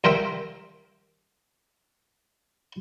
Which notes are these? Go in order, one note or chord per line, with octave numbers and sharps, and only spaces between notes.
C2 A#4 C5 E5 G5